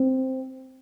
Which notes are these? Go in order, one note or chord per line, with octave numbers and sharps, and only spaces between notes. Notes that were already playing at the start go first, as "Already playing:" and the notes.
Already playing: C4